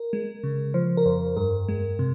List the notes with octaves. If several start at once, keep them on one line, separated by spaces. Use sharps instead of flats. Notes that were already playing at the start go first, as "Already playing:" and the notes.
Already playing: A#4
G#3
C#3
F3 C5
A#4
F2 C5
G2 A#4
G#3
C3